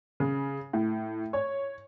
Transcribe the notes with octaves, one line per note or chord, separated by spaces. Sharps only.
C#3
A2
C#5